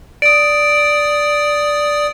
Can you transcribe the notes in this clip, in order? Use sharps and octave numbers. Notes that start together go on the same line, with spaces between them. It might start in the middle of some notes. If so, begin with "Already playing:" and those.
D5 D#6 D7